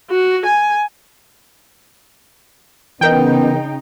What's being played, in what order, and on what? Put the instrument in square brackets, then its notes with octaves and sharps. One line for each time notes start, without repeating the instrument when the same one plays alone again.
[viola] F#4
G#5
[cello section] C#3 D#4 [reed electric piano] E3 A#4 D#5 [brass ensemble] B3 [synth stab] G5